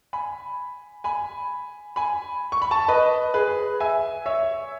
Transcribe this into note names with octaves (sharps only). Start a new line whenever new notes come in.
G#5 B5
G#5 B5
G#5 B5
C#6
B5
A5 C#6
B4 D#5
G#4 B4
E5 G#5
C#5 E5